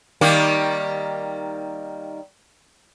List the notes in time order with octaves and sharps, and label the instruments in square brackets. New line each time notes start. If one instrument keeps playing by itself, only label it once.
[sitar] D#3 G3 A#3